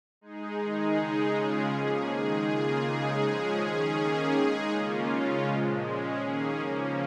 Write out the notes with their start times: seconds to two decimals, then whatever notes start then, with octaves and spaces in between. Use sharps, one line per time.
0.21 G#3 D#4 G#4
0.59 D#3 G#3 D#4 G#4
0.96 C#3 G#3 D#4 G#4
1.34 C#3 G#3 C#4 F4 G#4
1.71 F3 A#3 C#4 G#4
2.09 D#3 G#3 D#4 G#4
2.46 C#3 A#3 F4 G#4
2.84 C#3 G#3 D#4 G#4
3.21 F3 G#3 C#4 G#4
3.58 D#3 C#4 G#4
3.96 D#3 A#3 C#4 G#4
4.33 G#3 D#4 G#4
4.71 C#3 A#3 C#4 F4
5.09 C#3 G#3 C#4 F4
5.45 A#2 F3 G#3
5.83 G#3 C#4 G#4
6.20 D#3 A#3 C#4 G#4
6.58 C#3 F3 A#3 C#4